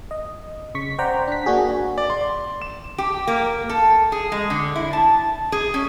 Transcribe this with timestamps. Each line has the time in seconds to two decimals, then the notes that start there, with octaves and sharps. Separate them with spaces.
0.11 D#5
0.75 C#3 C#6 B6
0.98 C5 D5 F#5 G5 A#5
1.27 D4 B6
1.46 A#3 D4 F#4 G#4
1.98 D5
2.10 C6
2.62 E7
2.98 G4
3.27 A#3
3.70 A4
4.12 G#4
4.32 G#3
4.50 D3
4.76 E4
4.93 A5
5.52 G#4
5.74 C#4